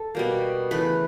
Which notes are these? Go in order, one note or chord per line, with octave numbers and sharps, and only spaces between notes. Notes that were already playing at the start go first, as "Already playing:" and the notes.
Already playing: A4
B2 G3 A#3
C#3 E3 A3 B4